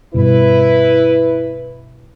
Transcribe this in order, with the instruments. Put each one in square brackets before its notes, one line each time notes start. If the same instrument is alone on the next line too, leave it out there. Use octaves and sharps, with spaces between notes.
[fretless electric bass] G2 B2 [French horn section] E4 B4